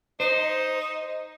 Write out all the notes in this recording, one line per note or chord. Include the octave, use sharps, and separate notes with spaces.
D#4 C5